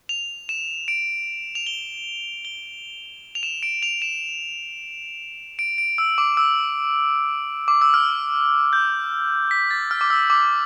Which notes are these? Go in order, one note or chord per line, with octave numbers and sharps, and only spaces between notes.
F7
E7
D7
F7
G7
G7
F7
E7
D7
F7
E7
D7
D7
E6
D6
E6
D6
E6
F6
G6
B6
A6
F6
D6
E6
D6